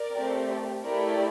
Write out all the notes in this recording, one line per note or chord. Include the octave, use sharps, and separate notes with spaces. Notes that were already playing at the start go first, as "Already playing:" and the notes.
Already playing: A#4 D5
A3 C4 G4
A3 E4 G4 A#4 D5